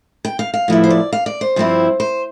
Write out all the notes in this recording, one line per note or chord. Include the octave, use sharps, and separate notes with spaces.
G5
F5
F5
A2 F3 B3 E4
C5
D5
F5
D5
C5
G2 F3 C4 E4
C5